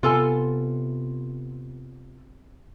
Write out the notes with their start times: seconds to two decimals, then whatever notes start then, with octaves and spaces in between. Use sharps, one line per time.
0.03 C3 B3 F4 A4 G#5